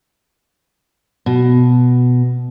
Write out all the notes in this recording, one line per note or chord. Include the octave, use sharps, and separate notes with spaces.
B2